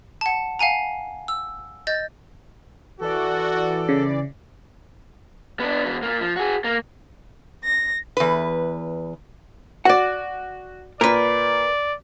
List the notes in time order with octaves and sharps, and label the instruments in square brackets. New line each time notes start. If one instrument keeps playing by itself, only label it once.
[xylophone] F#5 A5
F5 F#5 G#5 A#5
E6
D#5 G6 A6
[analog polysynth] E3 D5 [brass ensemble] F#4 [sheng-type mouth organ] A4
[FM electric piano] C#3
[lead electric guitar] B3 D4
E2 B2
A#2 A#3
F3
F#4 G#4
A#3
[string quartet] A#6
[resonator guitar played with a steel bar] E2 B4
[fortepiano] F#4 [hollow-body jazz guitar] D5 F#5
[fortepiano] A#2 [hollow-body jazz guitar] A#4 B4 [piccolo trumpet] D5